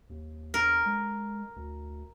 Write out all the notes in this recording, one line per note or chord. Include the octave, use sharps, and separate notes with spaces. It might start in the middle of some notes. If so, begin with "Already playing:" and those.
D#2
E2 A#4
G#3
D2